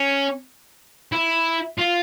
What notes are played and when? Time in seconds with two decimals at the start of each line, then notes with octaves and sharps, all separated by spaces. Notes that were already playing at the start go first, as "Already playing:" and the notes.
Already playing: C#4
1.12 E4
1.78 F4